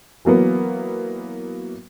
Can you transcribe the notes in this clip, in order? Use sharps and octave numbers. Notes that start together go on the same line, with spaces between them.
E3 F#3 A#3 B3